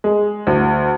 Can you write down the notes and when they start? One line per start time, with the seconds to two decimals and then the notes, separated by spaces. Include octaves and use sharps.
0.04 G#3
0.47 D2